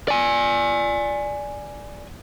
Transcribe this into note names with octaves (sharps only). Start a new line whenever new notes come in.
D5 G#5